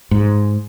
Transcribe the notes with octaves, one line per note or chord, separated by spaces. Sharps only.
G#2